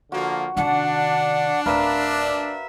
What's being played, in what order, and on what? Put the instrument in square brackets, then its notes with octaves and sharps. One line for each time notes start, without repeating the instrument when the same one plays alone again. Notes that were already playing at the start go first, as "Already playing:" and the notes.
[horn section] D3 F3 A#3 [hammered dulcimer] F#4
[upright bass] C3 D#3 [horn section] D4 [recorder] F#5
[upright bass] D1 [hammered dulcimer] A#4 B4 F5 [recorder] E5